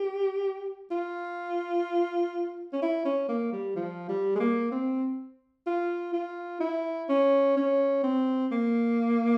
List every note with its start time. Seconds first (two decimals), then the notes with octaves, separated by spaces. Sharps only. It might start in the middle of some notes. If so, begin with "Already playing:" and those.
Already playing: G4
0.91 F4
2.73 C#4
2.82 E4
3.05 C#4
3.29 A#3
3.52 G3
3.76 F3
4.09 G3
4.35 G#3
4.40 A#3
4.71 C4
5.66 F4
6.13 F4
6.60 E4
7.09 C#4
7.57 C#4
8.03 C4
8.51 A#3